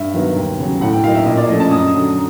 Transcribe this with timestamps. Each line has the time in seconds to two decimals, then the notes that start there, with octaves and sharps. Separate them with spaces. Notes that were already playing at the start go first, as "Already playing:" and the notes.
Already playing: G2 E5
0.14 D#3 F#3 B3
0.36 D#2
0.59 C#3 F#3
0.81 A2 F#5
0.93 G5
1.04 F#3 A#3 D#4 F5
1.15 E5
1.26 A#2 D#5
1.37 D5
1.48 F3 A3 C#4 D#5
1.60 A5
1.71 F#2 D#6
1.94 D3 F#3